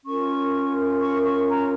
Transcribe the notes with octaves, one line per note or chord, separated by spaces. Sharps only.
C#4 F4 A#4 C#6
C#6
C#6
A#5